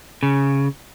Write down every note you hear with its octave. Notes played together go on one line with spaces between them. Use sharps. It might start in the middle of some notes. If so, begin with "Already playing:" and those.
C#3